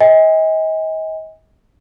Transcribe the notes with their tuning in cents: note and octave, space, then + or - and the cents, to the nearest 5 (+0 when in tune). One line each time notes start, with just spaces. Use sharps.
D#5 +35 G#5 -35